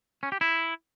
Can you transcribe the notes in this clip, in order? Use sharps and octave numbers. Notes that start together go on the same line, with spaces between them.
C#4
G4
E4